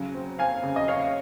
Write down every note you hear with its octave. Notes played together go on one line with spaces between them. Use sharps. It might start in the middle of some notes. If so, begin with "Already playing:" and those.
Already playing: C#3 F#3
C4
C4 F5 G#5
C#3
D#5
C#3 C#5 F5